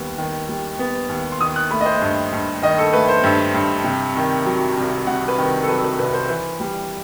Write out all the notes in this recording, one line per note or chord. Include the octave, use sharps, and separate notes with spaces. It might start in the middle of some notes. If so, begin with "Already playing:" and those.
Already playing: D#2 G3 B3
D#3
G3
B3
D#2
C6
D#3 D#6
F#6
A3 B5
D#5
C5
G2
G2
D#3 D#5
A4
A3 B4
C5
G2 E5
G2
C3
D#3
F#3
C2
C3 F#5
B4
D#3
A4
F#3 B4
A4
B4
C2 B4
C5
E3 B4
G3